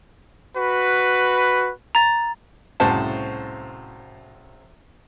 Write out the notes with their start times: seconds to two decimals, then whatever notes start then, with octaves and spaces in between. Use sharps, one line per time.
0.56 F#4 B4
1.95 A#5 A6
2.80 C2 A2 C#3 F#4 C5 A5